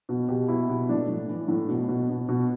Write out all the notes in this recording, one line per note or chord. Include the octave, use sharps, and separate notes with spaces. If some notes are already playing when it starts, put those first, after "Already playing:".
B2
B2 G4
B2 E4
B2
A2 D4
A2
E3
A2
B2
B2
B2
B2